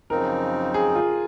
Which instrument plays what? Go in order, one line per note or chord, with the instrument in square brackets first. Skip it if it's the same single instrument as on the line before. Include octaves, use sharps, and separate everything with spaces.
[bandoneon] F#2 C#3 F3 C4 D#4 [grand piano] A#4
[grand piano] G#4
F4